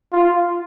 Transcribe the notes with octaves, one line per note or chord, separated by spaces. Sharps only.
F4